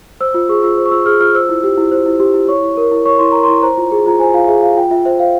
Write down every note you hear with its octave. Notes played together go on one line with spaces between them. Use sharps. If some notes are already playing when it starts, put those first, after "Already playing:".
C5 E6
F4 E6
G#4 C#6
F4 E6
C5
C#6
F4 E6
G#4 F6
F4 F6
C5 E6
E4
G4
E4
C5
E4
G4
E4
C#5 C#6
E4
A#4
E4
C#5 C#6
E4 C6
A#4 A#5
C6
E4
C5 A#5
F4
G#4
F4 A#5
C5 G#5
F4 F5
G#4 E5
F4 F5
F4 G5
F4 E5
C5 E5
C5 F5